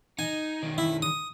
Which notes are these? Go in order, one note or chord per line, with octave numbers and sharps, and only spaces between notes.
D#4 G#5
B1 D#3
E4
D#6